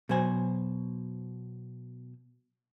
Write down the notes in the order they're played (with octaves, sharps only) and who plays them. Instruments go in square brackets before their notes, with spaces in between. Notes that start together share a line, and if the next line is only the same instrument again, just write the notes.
[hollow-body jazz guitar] B2 F#3 C5 G#5